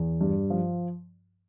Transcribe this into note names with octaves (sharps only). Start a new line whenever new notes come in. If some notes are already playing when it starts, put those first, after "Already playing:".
Already playing: E2
G2
F3